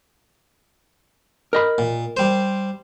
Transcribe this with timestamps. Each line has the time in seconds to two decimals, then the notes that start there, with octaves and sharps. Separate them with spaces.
1.53 A#4 D#5 B5
1.78 A#2
2.17 G3 C5